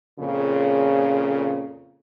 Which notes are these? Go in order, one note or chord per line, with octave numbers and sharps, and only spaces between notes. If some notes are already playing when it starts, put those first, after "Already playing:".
F2 A#2 C#3